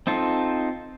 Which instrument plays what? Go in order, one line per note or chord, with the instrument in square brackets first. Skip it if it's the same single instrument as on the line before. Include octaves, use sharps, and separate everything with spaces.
[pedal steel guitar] C4 D#4 F4 A4